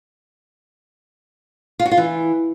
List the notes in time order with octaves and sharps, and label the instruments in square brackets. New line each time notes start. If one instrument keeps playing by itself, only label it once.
[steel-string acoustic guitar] F4
F#4
F4
E3